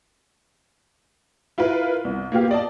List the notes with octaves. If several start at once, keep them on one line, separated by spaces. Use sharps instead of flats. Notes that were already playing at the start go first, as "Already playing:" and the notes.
E4 F4 A#4 B4
C2
A#3 B3 F4 G4 F5
D5 D#5 A5